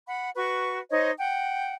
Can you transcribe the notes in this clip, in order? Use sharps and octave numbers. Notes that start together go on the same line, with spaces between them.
F#5 B5
F#4 B4 C#6
D#4 C5 C#5 D#5
F#5 G5